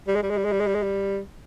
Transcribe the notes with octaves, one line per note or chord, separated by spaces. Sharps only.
G3
G#3
G3
G#3
G3
G#3
G3
G#3
G3
G#3
G3